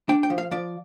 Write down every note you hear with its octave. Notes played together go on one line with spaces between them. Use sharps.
D4 G5
G5
F3
F5
F3 D5